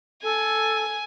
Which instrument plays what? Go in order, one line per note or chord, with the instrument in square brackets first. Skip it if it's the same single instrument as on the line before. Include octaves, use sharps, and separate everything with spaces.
[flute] A4 [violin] G#5